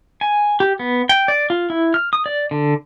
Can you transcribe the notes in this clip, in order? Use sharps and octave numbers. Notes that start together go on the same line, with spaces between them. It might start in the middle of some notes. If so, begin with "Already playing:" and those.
G#5
G4
B3
G5
D5
F4
E4
F6
D#6
D5
D3